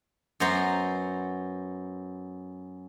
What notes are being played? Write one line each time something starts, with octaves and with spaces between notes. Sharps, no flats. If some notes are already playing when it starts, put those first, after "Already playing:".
F#2 B3 C5 A#5